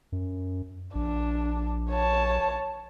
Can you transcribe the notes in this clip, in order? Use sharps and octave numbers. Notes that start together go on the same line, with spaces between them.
F#2
A#1 D4
C#5 A5